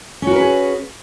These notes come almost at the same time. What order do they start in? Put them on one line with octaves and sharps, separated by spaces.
C#4 F#4 A#4 B4 G#4